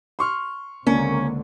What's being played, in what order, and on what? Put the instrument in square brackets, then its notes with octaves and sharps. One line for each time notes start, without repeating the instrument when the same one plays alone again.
[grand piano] C6 C#6 F6
[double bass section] C#2 D3 C4 [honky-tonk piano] A#3 [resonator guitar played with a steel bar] C#4